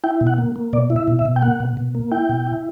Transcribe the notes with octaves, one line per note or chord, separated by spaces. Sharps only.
E4 G5
B2
F#5
A#3
A#3
B2 D5
E4
E5
B2
E5
B2
G5
A#3 F#5
B2
B2
A#3
E4 G5
B2
E4